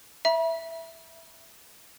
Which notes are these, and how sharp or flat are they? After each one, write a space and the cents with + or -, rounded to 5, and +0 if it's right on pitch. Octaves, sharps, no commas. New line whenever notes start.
E5 +0 B5 -45